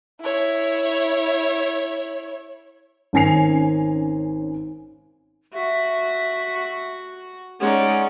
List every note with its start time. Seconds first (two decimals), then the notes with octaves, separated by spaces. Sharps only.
0.21 E4 C#5
3.13 G#1 C#4 G#5 A#6 C7 F7
5.54 F#4 E5
7.60 G#3 C#4 D#4 D5 F#5